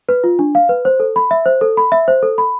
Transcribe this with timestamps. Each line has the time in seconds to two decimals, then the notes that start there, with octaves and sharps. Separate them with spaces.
0.09 B4
0.24 F4
0.39 D4
0.55 F5
0.69 B4
0.85 C5
1.00 A4
1.16 B5
1.31 E5
1.46 C5
1.61 A4
1.77 B5
1.92 E5
2.08 C5
2.23 A4
2.38 B5